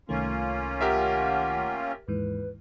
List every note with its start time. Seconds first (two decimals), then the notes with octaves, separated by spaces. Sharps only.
0.09 C2 D#3 A3 A#3 C#4 F4
0.81 G4 A#4 E5 F#5
2.08 D#2 G#2 E3 B4